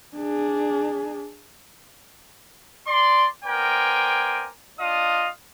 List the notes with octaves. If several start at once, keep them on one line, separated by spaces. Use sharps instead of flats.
D4 G#4
D5 C6
B3 A#4 C5 D5 G5 G#5
D4 F4 D#5 F5 D#6